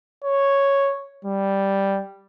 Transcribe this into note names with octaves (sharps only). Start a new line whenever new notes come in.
C#5
G3